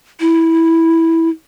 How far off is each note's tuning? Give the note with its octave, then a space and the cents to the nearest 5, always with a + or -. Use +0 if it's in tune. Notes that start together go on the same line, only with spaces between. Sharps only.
E4 -10